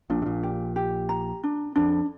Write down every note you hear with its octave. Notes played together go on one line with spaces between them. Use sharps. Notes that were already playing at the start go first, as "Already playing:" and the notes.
A#1 A#2 D4
C3
A#1 A#2
G4
G4
A#5
D4
F2 D4